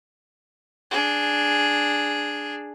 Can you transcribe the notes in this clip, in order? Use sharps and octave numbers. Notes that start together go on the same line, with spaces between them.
D4 G#4